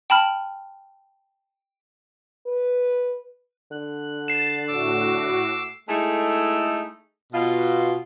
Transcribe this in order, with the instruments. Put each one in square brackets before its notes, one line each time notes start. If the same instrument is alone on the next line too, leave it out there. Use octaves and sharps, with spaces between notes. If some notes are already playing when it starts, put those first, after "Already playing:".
[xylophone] G5 A5 B5 F6
[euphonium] B4
[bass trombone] D3 [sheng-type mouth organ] F#6
[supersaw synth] A6 [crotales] C7 E7
[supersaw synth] A2 F#4 [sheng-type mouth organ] D6 E6
[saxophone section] G#3 A3 D#4 E4 G#4 A4
B2 F4